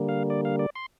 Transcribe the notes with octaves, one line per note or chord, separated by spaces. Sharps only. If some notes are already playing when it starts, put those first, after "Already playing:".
Already playing: D3 G3 A#3
F5
D5
F5
D5
C6